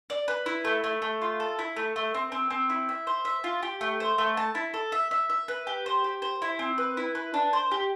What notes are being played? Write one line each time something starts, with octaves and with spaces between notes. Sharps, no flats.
D5
B4
E4
A3
A3
A3
F4
A4
E4
A3
A3
C4
C4
C4
E4
E5
C5
E5
F4
G4
A3
C5
A3
A5
E4
A4
E5
E5
E5
B4
G4
C5
G4
C5
E4
C4
B4
E4
B4
D4
C5
G4